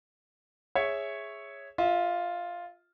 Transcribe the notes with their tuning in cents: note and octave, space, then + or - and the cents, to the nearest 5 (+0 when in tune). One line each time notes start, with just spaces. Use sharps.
G#4 +0 C#5 +0 E5 +0
F4 +0 E5 -35